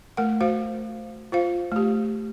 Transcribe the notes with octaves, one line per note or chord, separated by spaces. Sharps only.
A3 A#4 F#5
F#4 C5 F5
F4 C5 F5
A3 G4